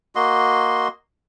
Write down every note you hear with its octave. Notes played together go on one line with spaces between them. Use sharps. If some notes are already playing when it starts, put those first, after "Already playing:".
A#3 F#4 D#5 C6